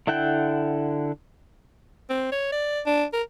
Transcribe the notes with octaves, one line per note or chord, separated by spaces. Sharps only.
D3 E4 A4 F#5 G5
C4
C#5
D5
D4
A#4